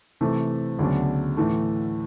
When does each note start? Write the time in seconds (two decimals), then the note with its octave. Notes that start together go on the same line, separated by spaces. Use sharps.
0.21 C3 E3 A3
0.79 D2 C#3 F#3 B3 D4
1.37 A2 E3 A3